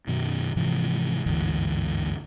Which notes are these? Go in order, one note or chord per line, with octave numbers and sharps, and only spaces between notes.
F#2 B2 D#3
G#2 C3 E3 F3
G1 D2 G#2 E3